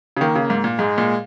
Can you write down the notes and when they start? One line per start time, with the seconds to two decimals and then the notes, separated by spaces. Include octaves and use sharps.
0.17 C#3
0.21 D#3 A#3
0.35 C#3
0.50 G#2
0.64 A#2
0.79 G#2 G#3
0.98 A#2